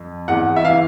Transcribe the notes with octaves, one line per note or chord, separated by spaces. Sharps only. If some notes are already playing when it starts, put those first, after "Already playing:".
Already playing: F2
E2 F#5
E5
E3 F5